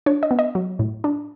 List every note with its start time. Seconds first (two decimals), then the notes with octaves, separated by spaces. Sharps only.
0.06 D4 C#5
0.23 D#5
0.31 B3
0.39 D#5
0.55 F#3
0.79 A2
1.04 D4